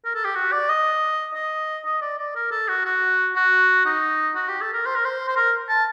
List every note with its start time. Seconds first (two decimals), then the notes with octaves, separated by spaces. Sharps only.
0.05 A#4
0.15 A4
0.24 G4
0.35 F#4
0.52 D5
0.69 D#5
1.35 D#5
1.86 D#5
2.01 D5
2.19 D5
2.35 A#4
2.51 A4
2.68 F#4
2.85 F#4
3.36 F#4
3.85 D#4
4.36 F#4
4.49 G4
4.61 A4
4.73 A#4
4.86 C5
4.95 A#4
5.05 C5
5.28 C5
5.36 A#4
5.69 A5